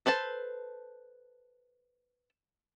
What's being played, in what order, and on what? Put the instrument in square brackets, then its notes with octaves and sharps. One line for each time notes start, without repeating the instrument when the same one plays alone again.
[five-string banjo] A4 B4 C5 A5